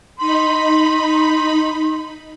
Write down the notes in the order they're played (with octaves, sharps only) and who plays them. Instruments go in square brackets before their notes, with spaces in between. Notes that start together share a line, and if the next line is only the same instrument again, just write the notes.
[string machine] D#4 B5 [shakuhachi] C6